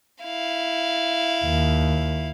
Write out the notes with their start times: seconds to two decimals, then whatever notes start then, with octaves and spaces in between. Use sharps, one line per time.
0.23 E4 F5
1.45 D#2